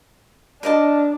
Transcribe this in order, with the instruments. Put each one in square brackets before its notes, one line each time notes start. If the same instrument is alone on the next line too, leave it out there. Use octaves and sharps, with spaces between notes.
[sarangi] D4 [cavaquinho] A#4 D#5 A5